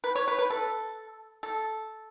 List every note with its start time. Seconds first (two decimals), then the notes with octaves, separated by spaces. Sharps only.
0.04 B4
0.15 C#5
0.28 B4
0.38 B4
0.50 A4
1.43 A4